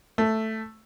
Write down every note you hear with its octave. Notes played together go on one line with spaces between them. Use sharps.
A3